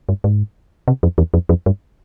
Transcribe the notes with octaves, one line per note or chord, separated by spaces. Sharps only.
G2
G#2
C3
F2
E2
F2
F2
G2